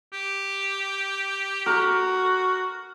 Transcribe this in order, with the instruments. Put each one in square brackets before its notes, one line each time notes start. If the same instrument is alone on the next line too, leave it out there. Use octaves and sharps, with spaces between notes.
[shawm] G4
[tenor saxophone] F#4 [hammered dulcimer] A#4